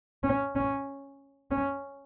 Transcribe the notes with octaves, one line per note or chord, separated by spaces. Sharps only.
C#4
C#4
C#4